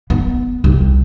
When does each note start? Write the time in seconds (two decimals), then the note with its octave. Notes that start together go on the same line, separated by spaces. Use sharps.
0.10 B3
0.64 C2